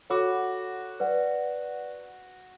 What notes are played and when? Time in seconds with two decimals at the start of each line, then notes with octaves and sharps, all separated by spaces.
0.10 F#4 A4 C#5 F#5 B5 D6
1.00 B4 D5 F#5